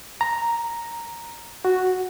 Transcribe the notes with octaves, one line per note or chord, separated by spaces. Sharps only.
A#5
F#4